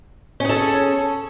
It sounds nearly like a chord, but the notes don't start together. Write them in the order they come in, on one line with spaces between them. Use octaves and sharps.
C#4 G#4 A4